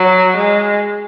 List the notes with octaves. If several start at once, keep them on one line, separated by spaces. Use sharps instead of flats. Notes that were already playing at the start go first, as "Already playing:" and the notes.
Already playing: F#3
G#3